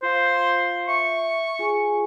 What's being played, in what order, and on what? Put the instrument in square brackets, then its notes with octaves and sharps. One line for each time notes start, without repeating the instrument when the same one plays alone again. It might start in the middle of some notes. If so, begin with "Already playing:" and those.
[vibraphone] F4 F5 [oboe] C5
[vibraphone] E5 [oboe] C#6
[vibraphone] F4 G#4 G#5